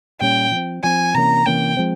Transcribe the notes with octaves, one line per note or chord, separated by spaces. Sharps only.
A#2 G3 C#4 G5
F3 C4
F3 C4 G#5
C3 E3 A#3 C#4 A#5
C3 E3 A#3 C#4 G5
F3 G#3 C4